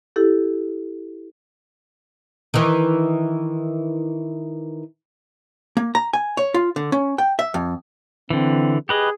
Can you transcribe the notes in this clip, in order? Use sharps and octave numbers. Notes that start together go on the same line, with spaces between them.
E4 G4 A4
D#3 E3
A#3
A#5
G#5
C#5
F4
D3
C#4
G5
E5
F2
D3 E3 C4
G4 G#4 B4 D#5